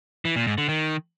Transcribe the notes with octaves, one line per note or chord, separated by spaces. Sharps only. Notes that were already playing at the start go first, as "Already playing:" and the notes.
E3
A#2
G#2
D3
D#3